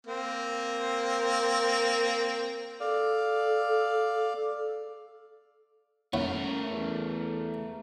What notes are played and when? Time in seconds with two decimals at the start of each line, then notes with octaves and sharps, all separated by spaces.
0.07 A#3 C4
2.80 A4 D5 F5
6.13 A3 C#4 E4 A#4 C#5 F#5
6.71 E2